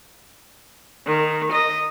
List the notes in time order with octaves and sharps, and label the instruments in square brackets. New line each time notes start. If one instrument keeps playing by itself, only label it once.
[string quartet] D#3
D#5